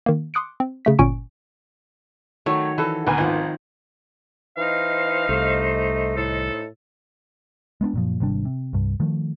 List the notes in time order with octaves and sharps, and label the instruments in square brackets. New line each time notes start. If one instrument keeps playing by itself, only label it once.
[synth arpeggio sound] D#3 A#3
C6 D6 D#6 F#6 C#7 D7
C4
C#3 A3 B6
G1 A#2 C#4 G#5 C#6 D7
[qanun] D#3 F#3 C#5 [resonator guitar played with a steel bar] A3
[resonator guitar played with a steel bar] E3 A4
[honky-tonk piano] D2 B4 G#5 [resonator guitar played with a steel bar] A#3 B3
[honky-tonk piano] G#1 [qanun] D#3 F3
[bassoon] E3 [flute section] D#4 C5 D#5 [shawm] F5
[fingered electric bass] C2 [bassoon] A3
[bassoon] A2 [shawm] A4
[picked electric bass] G#3 B3 C4 D4
F#2 A#2 F3
G#1 C3 G3 D4
C3
C2 G2
D#3 F3 A3